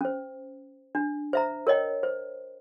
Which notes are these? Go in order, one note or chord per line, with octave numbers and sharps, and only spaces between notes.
C#4 C5
D4
C5 E5 A#5
A#4 C#5 D#5 G5
C5